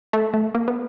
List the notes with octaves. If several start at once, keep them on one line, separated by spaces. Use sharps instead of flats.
A3
A3
A#3
B3